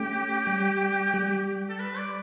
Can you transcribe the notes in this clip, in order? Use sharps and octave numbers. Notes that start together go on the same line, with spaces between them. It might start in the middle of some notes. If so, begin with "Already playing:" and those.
Already playing: A3 C#4 G4
G3
G3
A4
B4
D5